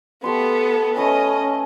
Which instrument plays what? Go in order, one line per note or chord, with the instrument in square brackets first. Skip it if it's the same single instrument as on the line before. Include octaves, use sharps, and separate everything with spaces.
[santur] A3 G4 C6 [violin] B3 A4
[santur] A3 B4 G#5 [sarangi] C#4 [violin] D#5